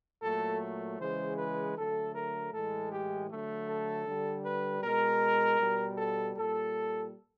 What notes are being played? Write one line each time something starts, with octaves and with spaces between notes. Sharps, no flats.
A#2 F#3 A3 A4
C#3 E3 G#3 C5
B4
D3 F#3 A3 A4
A#4
A2 E3 G#3 A4
G4
D3 F#3 A3
A4
D3 G3
B4
B2 G#3 A#4
B2 G3
A4
A#2 G3 A4